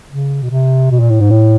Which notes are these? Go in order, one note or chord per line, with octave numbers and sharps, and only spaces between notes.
C#3
B2
C3
B2
A#2
A2
G#2
A2